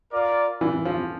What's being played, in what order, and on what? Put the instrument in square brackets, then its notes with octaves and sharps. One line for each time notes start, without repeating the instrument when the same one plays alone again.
[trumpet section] F4 A#4 D5
[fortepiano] E3
F3